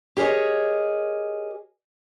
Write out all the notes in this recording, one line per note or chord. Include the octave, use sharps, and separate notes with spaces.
G4 G#4 A#4 C#5 D#5